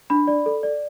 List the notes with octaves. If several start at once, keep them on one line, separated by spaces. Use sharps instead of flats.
D4 B5
D5
A4
D5